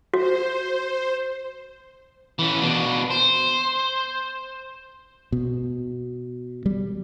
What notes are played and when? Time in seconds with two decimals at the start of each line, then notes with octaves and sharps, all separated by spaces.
0.14 F#4 C5
2.39 E3 C#4
2.61 B2 D4
3.11 C5
5.32 B2
6.66 G3